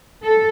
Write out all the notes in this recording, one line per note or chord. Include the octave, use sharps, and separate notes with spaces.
A4